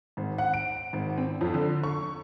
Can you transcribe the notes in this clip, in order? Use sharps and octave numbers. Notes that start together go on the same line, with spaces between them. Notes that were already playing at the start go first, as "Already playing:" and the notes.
G#1
F#5
D7
G#1
C4
F2
D3
C#6